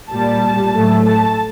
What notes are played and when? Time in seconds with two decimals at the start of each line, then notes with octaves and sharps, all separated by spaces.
0.11 A#2 G3 A5
0.74 A2 F#3 A3
1.06 A5